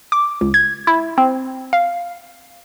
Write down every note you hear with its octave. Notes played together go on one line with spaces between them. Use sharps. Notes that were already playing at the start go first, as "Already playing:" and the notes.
D6
C#2
G#6
E4
C4
F5